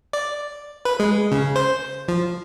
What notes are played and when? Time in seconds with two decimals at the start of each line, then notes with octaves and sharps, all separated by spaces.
0.13 D5
0.85 B4
1.00 G#3
1.32 C#3
1.56 C5
2.08 F3